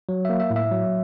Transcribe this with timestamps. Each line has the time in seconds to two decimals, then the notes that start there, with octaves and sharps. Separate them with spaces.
0.09 F#3
0.25 A#3 E5
0.40 E5
0.50 A2
0.56 E5
0.71 F#3